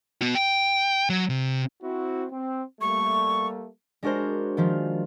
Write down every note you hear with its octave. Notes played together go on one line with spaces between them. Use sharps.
B3 F#4
G5
F#3
C3
C4 E4 F#4
C4
G3 A3 A#3 C#6
G#3 D4 F#4 A#4 C5
D#3 F3 F4